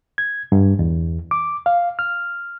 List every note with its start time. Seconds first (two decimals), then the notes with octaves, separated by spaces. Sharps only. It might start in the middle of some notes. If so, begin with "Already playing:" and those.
0.18 G#6
0.52 G2
0.79 E2
1.31 D6
1.66 F5
1.99 F6